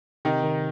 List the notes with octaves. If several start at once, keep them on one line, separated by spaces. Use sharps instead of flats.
C3 D#3 D#4
D#3